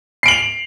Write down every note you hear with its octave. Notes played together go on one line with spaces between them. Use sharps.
C7 D7 F7 F#7